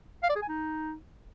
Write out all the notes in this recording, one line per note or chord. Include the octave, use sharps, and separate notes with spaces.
F5
D5
G#4
G#5
D#4